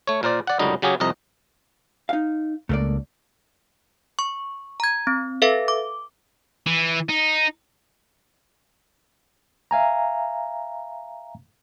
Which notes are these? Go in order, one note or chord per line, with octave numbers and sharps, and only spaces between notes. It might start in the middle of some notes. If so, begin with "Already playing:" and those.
A3 C#5
A#2 A#4 C5 D5
D5 F#5
C#2 F#2 D3 G3 D#4 D#5
C#3 F#3 C#4 G4 G#4
C2 F2 C3 D#5 A#5
D#4 F5
C#2 A3 A#3 D5
C#6
A#5 G#6
C4
A4 B4 E5 F5
D6
E3
D#4
E5 F5 G#5 A#5